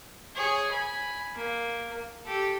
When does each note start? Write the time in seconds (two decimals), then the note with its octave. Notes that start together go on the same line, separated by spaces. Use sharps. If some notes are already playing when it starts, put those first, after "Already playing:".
0.36 G#4 C#5
0.71 G#5 B5
1.35 A#3
2.25 G4 A4